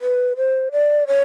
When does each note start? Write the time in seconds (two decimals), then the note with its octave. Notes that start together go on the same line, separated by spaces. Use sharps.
0.01 B4
0.37 C5
0.72 D5
1.07 C#5